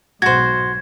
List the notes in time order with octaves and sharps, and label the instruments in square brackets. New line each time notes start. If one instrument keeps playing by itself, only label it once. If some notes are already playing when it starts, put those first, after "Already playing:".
[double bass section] B1 G#2 [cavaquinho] F#4 C5 [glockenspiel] G#6